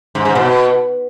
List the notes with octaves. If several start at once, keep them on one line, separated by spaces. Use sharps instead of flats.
G#2
G#2
B2